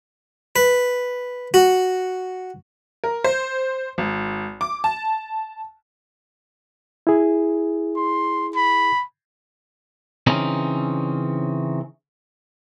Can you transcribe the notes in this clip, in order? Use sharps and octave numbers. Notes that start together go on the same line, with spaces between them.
B4
F#4
A#4
C5
G#1
D6
A5
E4 G#4
C6
B5
C#3 E3 C4 C#4 D#4